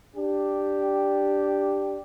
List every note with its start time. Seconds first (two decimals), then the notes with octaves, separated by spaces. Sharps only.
0.16 D4 G4